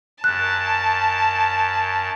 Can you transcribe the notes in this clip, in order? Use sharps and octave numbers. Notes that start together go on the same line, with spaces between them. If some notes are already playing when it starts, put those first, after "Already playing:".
F#2 A5 F#6